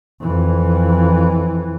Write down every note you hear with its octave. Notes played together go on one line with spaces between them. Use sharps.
F2 E3